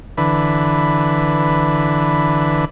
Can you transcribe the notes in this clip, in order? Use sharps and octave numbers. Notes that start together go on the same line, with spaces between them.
D3 E3 B4